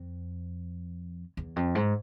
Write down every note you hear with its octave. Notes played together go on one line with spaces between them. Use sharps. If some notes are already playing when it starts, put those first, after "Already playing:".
Already playing: F2
E2
F2
G#2